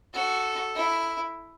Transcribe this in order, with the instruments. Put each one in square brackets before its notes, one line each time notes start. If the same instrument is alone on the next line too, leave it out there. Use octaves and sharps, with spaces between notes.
[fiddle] F#4 [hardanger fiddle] A4
[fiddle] E4